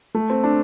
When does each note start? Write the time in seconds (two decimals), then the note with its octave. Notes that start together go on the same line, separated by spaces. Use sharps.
0.14 A3
0.30 C4
0.44 D4